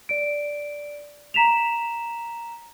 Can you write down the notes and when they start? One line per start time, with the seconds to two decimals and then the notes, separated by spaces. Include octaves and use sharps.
0.09 D5 D7
1.34 A#5 B6 E7 F7